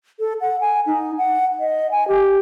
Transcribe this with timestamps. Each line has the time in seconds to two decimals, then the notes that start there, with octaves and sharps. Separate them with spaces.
0.20 A4
0.41 F#5
0.61 G#5
0.87 D#4
1.18 F#5
1.60 D#5
1.91 G#5
2.08 G4